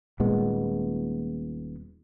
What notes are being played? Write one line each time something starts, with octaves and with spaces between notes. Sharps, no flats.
D#1 A#2 G#3 B3